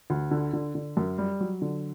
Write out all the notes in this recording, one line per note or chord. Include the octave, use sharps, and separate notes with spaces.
D2
D3
D3
D3
F#2
G3
F#3
D3